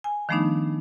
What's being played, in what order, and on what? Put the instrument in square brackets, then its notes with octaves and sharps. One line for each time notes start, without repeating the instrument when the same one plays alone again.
[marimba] G#5
D#3 F3 A3 B3 D4 D#4